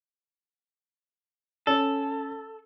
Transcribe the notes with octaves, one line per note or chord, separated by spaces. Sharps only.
C#4 A4